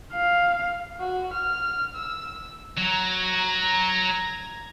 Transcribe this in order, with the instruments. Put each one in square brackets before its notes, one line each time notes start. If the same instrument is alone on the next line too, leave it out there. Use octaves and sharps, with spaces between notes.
[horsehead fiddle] F5
[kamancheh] F#4
F6
E6
[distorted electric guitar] F#3 [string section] A#5 G#6 A#6